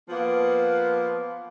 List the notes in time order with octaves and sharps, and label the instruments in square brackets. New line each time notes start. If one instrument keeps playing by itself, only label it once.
[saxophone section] F3 A#3 B3